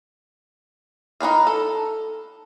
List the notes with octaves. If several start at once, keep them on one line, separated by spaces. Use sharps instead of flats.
D#4 A#4 B4 F5
A4